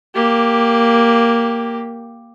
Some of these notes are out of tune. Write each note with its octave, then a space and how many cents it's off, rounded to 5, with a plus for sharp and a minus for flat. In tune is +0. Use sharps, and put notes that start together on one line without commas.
A#3 +0 G4 +5